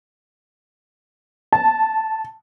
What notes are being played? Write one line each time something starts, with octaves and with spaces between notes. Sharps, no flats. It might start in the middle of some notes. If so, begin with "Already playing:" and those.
A5